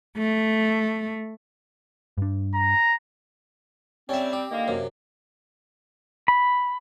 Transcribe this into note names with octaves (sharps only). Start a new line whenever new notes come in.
A3
G2 D4
A#5
G3 C4 C#4 E5
G4
D3 D#3 A#3
F#2 C3
B5